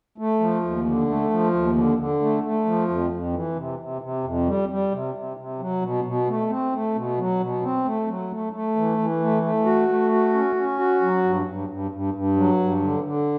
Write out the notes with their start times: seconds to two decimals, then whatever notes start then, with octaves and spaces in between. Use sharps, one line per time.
0.18 A3
0.40 F3
0.63 D#2
0.86 D3
1.08 A3
1.30 F3
1.53 D#2
1.76 D3
1.98 D3
2.21 A3
2.44 A3
2.66 F3
2.89 F2
3.11 F2
3.33 E3
3.56 C3
3.79 C3
4.02 C3
4.24 F2
4.46 G3
4.69 G3
4.91 C3
5.14 C3
5.37 C3
5.59 F#3
5.82 B2
6.04 B2
6.27 A3
6.49 C4
6.73 A3
6.95 B2
7.18 F#3
7.40 B2
7.62 C4
7.85 A3
8.08 F#3
8.31 A3
8.53 A3
8.76 E3
8.98 E3
9.20 A3
9.43 A3
9.65 F#4
9.88 A3
10.11 F#4
10.34 C#4
10.56 C#4
10.78 F#4
11.01 F#3
11.24 G2
11.46 G2
11.69 G2
11.91 G2
12.14 G2
12.37 F#3
12.59 G2
12.82 D3
13.04 D3